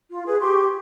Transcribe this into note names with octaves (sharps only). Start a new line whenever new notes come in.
F4
G#4 B4
G4 C6 C#6